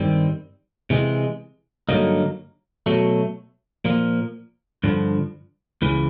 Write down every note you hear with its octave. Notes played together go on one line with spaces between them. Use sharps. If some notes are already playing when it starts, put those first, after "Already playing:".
Already playing: G2 D#3 G3 C4
C3 E3 G#3
G2 D3 F#3 A#3 D#4
B2 F#3 A3
A#2 F3 A#3
G2 D3 F3
C#2 C#3 E3